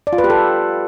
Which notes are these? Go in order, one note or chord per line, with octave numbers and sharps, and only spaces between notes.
D5
F4
B4
G4
A4